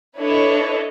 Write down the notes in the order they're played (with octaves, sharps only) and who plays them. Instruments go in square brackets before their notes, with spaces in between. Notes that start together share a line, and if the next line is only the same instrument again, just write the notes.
[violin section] D4 E4 A4 B4 C#5 D#5